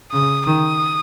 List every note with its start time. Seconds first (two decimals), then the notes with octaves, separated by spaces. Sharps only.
0.12 C#3 D#6
0.46 D#3 D#6